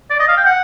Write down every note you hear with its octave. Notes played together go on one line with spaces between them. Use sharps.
D5
D#5
F5
G5
F#5